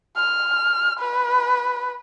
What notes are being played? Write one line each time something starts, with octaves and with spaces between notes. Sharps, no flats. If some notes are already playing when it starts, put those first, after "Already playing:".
F6
B4